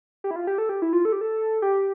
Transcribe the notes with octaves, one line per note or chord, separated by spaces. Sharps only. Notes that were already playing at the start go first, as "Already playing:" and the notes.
G4
E4
F4
G4
A4
G4
E4
F4
A4
G4
A4
G4